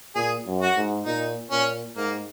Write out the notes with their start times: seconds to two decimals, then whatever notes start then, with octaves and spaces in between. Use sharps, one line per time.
0.16 A#2 G#4
0.46 F#2
0.62 F#4
0.77 G#2
1.06 A#2 D#4
1.51 A#2 C#4
1.96 G#2 A#3